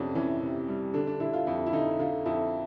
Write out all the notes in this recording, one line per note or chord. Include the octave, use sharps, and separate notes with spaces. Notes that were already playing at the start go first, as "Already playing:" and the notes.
Already playing: F2 C3 C#4 D4
E3 C#4
C3
G3
D3 D4
D4
D3 E4
F4
F2 E4
E4
D3 D#4
D3 F4
F2 E4